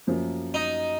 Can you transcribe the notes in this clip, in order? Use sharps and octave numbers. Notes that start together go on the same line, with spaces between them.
F#2 F3 A#3
D#4